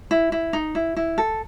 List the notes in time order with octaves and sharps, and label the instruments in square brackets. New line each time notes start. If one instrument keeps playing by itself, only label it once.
[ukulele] E4
E4
D#4
E4
E4
A4